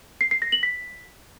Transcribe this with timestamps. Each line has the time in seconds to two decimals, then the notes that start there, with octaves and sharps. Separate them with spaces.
0.21 C7
0.31 C7
0.42 A#6
0.52 F#7
0.63 B6